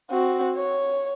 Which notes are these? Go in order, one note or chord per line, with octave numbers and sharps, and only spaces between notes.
C4 F#4
C#5